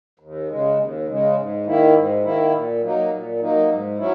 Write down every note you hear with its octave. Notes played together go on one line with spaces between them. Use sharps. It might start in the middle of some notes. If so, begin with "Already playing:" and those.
D#2
C#3 G#3
D#2
C#3 G#3
G#2
D#3 A#3 E4
G#2
D#3 A#3 E4
A#2
F#3 A#3 D#4
A#2
F#3 A#3 D#4
G#2
F#3 C#4 E4